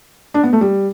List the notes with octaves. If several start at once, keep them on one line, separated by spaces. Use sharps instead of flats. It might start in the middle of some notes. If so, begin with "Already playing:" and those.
D4
B3
A3
G3